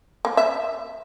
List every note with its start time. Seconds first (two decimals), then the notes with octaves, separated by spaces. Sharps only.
0.25 A#3
0.37 E5